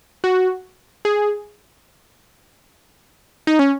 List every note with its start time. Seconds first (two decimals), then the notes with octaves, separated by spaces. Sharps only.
0.24 F#4
1.05 G#4
3.47 D#4
3.59 C#4